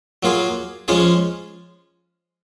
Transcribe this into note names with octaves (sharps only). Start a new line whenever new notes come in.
F#3 A#3 F4 G#4
F3 G#3 C#4 F4 G#4